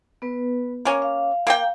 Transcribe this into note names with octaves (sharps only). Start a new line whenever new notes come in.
B3 B4
A#3 C#4
F5
A#3 G#4 G5